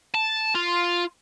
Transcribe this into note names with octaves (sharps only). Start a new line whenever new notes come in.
A5
F4